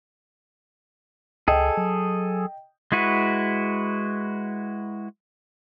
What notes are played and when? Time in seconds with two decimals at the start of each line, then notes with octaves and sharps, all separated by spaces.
1.48 C#2 G#4 A4 D#5 G5
1.77 F#3
2.92 G#3 E4 F#4 B4